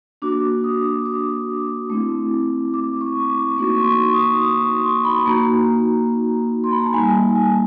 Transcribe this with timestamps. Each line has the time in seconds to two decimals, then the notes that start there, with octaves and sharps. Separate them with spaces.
0.22 A#3 D4 F#4 D6
0.64 D#6
1.05 D6
1.90 A3 C4 E4
2.74 D6
3.01 C#6
3.30 D6
3.58 A#3 D#4 F#4 C#6
3.80 C6
3.86 C#6
4.14 D#6
4.42 D#6
4.62 C#6
4.83 C6
5.05 B5
5.25 A#3 D#4 F#4 A#5
6.64 C6
6.72 B5
6.78 A#5
6.86 A5
6.93 G3 A#3 D#4 G#5
7.29 A5
7.35 G#5